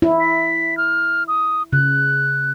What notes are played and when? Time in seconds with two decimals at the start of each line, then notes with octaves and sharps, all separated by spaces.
0.02 E4
0.20 B6
0.77 F6
1.28 D#6
1.73 C#3 F#6